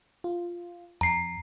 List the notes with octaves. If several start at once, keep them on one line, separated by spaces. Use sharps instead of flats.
F4
F2 A#5 C7